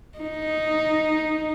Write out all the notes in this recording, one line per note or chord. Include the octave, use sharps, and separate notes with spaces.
D#4